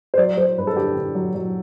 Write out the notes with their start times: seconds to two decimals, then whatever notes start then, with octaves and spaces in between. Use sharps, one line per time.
0.14 C5
0.18 F#3 D5
0.37 F#3 C5
0.57 G2 B4
0.67 A4
0.76 D3 G4
0.96 D3
1.15 F#3
1.35 F#3